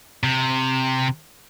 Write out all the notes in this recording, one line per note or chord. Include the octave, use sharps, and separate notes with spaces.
C3